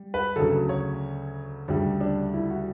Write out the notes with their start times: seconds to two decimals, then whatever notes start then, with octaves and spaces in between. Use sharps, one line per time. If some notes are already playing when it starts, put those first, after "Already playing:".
Already playing: G3
0.14 B4
0.36 D2 C#3 F#3 A4
0.69 C#5
1.68 D2 C#3 G3 D4
2.01 D4
2.34 E4
2.50 F#4